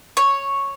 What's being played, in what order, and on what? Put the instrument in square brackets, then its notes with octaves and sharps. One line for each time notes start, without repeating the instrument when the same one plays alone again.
[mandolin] C#5